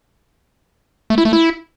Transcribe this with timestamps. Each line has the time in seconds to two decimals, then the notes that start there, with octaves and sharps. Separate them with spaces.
1.10 A3
1.18 E4
1.25 A3
1.33 E4